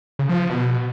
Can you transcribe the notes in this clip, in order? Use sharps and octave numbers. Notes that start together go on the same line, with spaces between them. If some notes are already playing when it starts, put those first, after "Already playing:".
C#3
F3
F3
B2